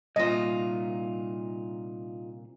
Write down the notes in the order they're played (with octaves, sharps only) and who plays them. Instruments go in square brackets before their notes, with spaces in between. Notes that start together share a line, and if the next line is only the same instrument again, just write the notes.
[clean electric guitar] C2 A#2 [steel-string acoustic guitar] D#4 F4 [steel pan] D#5